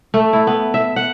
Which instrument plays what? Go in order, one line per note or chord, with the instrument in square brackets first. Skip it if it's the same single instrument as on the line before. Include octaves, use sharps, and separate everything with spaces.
[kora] A3
E4
B3
E5
F#5